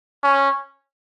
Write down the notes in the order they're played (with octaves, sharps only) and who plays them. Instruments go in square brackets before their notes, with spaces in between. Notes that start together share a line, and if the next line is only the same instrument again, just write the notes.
[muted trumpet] C#4